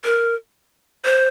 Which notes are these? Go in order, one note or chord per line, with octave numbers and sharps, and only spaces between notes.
A#4
C5